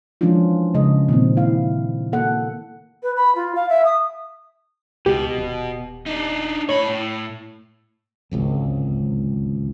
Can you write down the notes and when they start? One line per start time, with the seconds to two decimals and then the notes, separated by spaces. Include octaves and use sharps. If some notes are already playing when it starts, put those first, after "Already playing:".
0.21 E3 F3 G#3 C#4 D4 F4
0.74 C#3 G#3 D#5
1.09 A#2 D#3 C4
1.37 E4 F5
2.12 A#3 A4 F#5
3.03 B4
3.16 B5
3.35 F4
3.55 F5
3.69 E5
3.85 D#6
5.06 C#2 B2 G4
5.37 D#1
6.06 D4 D#4
6.69 A2 C#5 B5
6.89 A2
8.31 D1 G#1 C#2